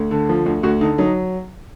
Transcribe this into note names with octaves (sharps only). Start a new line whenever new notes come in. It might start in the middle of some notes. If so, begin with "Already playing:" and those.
Already playing: D2
D3
F3
D2
D2 F#4
D3 D#4
F#3 D#4